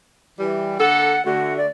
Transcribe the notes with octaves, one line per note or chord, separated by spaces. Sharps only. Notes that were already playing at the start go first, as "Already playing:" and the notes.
E3 G3
D3 A#3 A4 F#5
D3 A3 F#4
D5